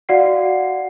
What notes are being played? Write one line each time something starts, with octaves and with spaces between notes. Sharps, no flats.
F#4 D5 F5 F#5 C7